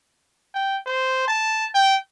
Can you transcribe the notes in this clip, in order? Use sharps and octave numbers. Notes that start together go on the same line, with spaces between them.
G5
C5
A5
G5